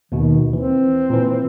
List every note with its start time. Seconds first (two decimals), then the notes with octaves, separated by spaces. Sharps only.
0.12 D#2 B2 D#3
0.53 E3 C4
1.10 A#2 E3